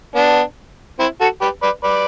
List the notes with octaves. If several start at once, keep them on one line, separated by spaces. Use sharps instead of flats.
B3 D4
C4 E4
F#4 A4
G4 B4
B4 D5
B4 D5